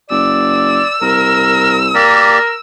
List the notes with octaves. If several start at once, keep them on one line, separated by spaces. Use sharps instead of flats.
F#1 D5 E6
C2 A#4
A#3 G4 A#4 D5